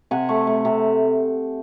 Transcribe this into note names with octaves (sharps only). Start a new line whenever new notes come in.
C3 F#5 G#5
A3
A3
C3